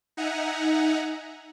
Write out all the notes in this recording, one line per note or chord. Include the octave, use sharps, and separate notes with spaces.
D#4 E5 F#5 G#5 A#5